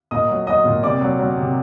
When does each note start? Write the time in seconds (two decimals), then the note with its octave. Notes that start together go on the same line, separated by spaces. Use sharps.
0.11 A#2 D#5 D#6
0.29 F#3
0.47 F#3 D#5 D#6
0.65 A#2
0.83 C3 D5 D6
1.01 F#3
1.19 F#3
1.37 C3